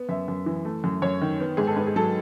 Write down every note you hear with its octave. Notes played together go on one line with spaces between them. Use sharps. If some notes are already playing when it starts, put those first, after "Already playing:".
Already playing: B3
F#2 E5
F#2
E3
A3
F#2
F#2 C#5
D#3
B3
G#2 G#4
A4
G#2 B4
G#4
F#3 A4